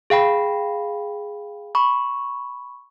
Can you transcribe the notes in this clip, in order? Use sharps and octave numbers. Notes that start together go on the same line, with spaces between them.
G#4 F5 G5 B5
B5 C#6